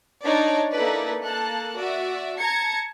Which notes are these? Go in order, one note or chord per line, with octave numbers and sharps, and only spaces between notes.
D4 D#4 C#5 D5
A#3 D#4 E4 A4 B4 D5
A#3 A4 A5 F#6
F#4 D5 E5
A5 A#5 G#6 C#7